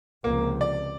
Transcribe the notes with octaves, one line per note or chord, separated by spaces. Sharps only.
C#2 C3 F3 A#3
D5